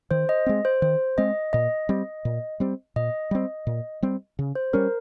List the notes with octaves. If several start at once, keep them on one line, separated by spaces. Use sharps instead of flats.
D#3 C5
D#5
G#3 C4
C5
D#3 C5
G#3 C4 D#5
A#2 D#5
G3 C4
A#2
G3 C4
A#2 D#5
G3 C4
A#2
G3 C4
C#3
C5
G3 C#4 A#4